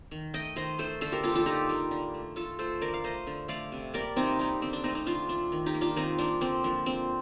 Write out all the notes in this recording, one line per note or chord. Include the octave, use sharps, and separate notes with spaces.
D#3
A3 D#5 G5
D#3 C5 D#5
A3 A4 C5
D3 A4 C5
G4 A#4
G3 A#3 F4 A4
F4 A4
D3 D#4 G4
G3 A#3
D3
A3
D3 F4 A4
A3 A4 C5
D3 A#4 D5
F5
A3 C5 D#5
D3
A3 D5 F5
C3
G3 A#3 A#4 D5
C3 C4 D#4
G3 A#3
D3 C4
D4
A3 C4 D#4
C4 D#4
D3 D4 F4
A3 D4
D#3
D#4 G4
A#3
D4 F4
D#3 C4 D#4
A#3 D4
D3 C4
F3 A#3 D4
D3 C4